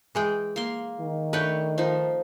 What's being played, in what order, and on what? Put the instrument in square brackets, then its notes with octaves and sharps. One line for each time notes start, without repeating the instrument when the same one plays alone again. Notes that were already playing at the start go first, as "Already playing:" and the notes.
[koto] E3 G#3 G5
[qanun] A#3 C6
[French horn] D#3
[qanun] A3 D4 C#5 [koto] B4 G5
[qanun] F3 D#4